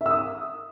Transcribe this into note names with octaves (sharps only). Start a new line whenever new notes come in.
E5
E6
D#6